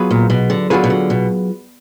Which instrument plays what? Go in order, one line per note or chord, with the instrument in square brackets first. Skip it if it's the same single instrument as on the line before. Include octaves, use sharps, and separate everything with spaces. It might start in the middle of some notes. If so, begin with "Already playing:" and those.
Already playing: [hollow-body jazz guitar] F#3 B3 F4 G#4 B4
[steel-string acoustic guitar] A#2
B2
D3
[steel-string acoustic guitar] D3 [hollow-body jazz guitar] F#3 B3 F4 G#4 B4
[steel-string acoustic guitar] B2
D3
B2